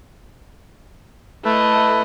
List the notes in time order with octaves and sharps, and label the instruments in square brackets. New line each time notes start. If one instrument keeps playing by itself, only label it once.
[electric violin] A3 D#5 [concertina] E4 A4 B4